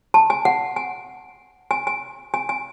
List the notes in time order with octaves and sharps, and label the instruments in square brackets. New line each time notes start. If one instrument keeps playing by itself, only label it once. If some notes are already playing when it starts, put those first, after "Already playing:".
[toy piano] A5
G#5
F#5
G#5
G#5
G#5
G#5
G#5